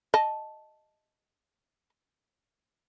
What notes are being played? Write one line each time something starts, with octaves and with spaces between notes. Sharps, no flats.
D#5 A5